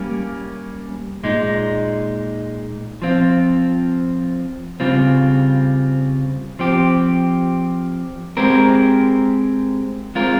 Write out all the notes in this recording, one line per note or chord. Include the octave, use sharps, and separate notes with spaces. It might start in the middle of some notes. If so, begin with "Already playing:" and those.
Already playing: G3 A#3 C#4
A#2 G#3 D#4
F3 C4 F4
C#3 G3 C4 F4
F3 C4 G4
G#3 C4 G4 A#4
G#3 C4 F4 A#4